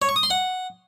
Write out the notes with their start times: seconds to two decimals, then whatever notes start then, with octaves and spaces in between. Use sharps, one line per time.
0.02 C#5
0.09 C#6
0.16 D#6
0.23 C6
0.30 F#5